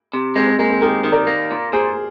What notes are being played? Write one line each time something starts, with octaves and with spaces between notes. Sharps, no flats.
C3
G#3 C4
C4
G#3 A#3
C4
D#3 G4 A#4
D#3
A#4 D5
A#3
A#2
A#2 G#4 C5